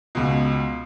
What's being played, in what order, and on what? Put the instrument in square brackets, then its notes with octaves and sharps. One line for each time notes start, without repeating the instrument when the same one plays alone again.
[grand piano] C#2 B2